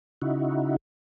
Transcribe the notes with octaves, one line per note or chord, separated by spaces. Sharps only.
C#3 D#4 E4 F#4